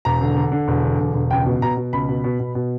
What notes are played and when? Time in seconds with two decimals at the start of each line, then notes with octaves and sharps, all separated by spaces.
0.05 E1 A#5
0.21 D3
0.36 D3
0.52 D3
0.68 E1
0.84 D3
1.00 E1
1.15 E1
1.31 C#2 G5
1.46 B2
1.62 B2 A#5
1.77 B2
1.93 C#2 B5
2.09 B2
2.24 B2
2.40 B2
2.55 B2